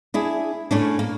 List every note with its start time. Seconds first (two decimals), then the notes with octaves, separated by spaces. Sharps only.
0.14 D4 E4 G#4
0.71 A2 C#4 D4
0.99 A#3